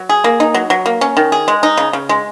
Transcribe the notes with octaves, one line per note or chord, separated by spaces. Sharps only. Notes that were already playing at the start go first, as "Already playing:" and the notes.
Already playing: F#3
G#4
A#3
D#4
F#3
F#3
A#3
C#4
D#3
G#4
G#3
D#4
C#3
C#3
G#3